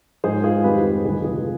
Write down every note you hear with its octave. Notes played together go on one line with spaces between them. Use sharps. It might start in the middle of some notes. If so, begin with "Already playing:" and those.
G#2 F3 G#3 G#4 C5
F4 G#4
F2 D#3 G3 G4 B4
D2 C3 D#3 G3 F4 G#4
F4 G#4